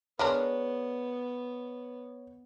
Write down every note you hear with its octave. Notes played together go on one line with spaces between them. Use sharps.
G#3 B3 D4 A#4 C#5